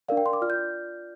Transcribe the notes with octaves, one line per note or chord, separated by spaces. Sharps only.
D4 A#4 D5 F5
G5
C6
D6
F4 D5 F6
G6